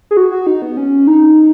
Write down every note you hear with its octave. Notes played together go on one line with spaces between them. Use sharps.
G#4
F#4
F#4
D#4
B3
C#4
D#4